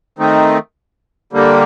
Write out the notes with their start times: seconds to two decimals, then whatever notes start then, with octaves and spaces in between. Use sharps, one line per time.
0.18 D#3 A3 C4 D#4
1.33 D3 G3 A#3